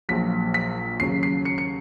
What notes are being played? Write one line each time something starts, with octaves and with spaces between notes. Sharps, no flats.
A#1 A#2 F#3 B6
B6
D#2 C#3 F#3 C7
C7
C#7
C#7